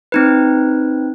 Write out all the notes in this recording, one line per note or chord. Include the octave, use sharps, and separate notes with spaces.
C4 D#4 B4